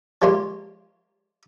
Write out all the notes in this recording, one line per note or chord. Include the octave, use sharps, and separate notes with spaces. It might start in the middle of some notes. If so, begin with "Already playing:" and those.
F3 G#3 A#3 G4 C5 C#5